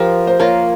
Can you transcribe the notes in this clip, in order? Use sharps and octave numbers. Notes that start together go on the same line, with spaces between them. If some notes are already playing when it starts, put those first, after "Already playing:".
Already playing: F3 G4 A#4
C5
A#3 F4 A#4 C#5